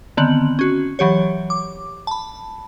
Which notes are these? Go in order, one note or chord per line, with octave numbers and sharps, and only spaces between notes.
D3 D#3 B3 C4 F#7
C#4 F#4
E3 F#3 G4 C#5
D6
A5 B5